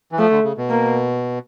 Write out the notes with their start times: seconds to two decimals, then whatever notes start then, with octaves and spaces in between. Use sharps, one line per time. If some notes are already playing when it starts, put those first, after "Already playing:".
0.12 E3
0.18 F3 A3
0.31 D3
0.43 C#3
0.57 B2
0.70 A#3